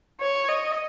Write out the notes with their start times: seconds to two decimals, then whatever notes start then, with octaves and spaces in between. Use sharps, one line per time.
0.20 C#5
0.48 D#5